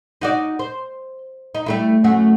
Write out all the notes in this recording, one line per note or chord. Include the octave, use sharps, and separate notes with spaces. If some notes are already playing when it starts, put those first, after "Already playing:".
D#4 F#4 D5
C5
D#4
G3 A3 E4
F#2 A3 F#4